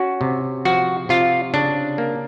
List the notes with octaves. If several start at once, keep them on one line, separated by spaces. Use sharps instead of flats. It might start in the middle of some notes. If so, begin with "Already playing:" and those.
Already playing: C#4 F#4
C3
F3 F#4
C3 F4
C#3 D4
A#3